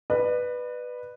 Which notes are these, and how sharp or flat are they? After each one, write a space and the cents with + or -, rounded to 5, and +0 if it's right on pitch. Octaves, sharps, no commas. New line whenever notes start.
B4 +0 D5 +40